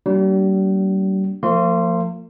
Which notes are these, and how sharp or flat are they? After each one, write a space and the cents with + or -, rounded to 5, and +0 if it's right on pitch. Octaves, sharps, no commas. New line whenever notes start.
G3 -40 A#3 -20 D4 -35
F3 +5 A#3 -45 C6 +0